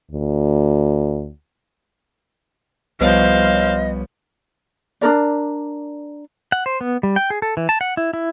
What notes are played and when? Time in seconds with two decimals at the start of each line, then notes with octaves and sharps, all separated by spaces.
0.11 D2
3.01 C2 F3 G3 B3 C5 C#5 D#5 F5
5.01 D4 D#4 A#4 D5
6.52 F#5
6.66 C5
6.81 B3
7.03 G3
7.16 G5
7.30 G#4
7.42 A4
7.57 E3
7.69 A5
7.81 F#5
7.97 E4
8.13 E4